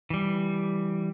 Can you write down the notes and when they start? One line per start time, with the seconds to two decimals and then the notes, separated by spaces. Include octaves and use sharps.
0.10 E3 G3